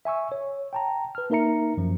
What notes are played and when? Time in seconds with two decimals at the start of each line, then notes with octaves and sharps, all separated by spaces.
0.05 E5 G#5 C#6 E6
0.32 C#5
0.73 G5 A5 A#5
1.15 B4 F6
1.30 A#3 D#4 A#4 E5 A#5 C#7
1.77 F#2 F3